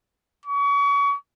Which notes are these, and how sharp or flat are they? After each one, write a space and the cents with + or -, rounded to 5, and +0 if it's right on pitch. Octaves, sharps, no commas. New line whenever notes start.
C#6 +35